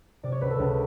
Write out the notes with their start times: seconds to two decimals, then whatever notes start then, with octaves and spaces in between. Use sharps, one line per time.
0.23 C3 D5
0.32 C#5
0.41 C#2 B4
0.50 A4
0.59 C#2